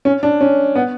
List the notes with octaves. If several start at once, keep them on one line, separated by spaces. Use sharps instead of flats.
C#4
D4
C#4
B3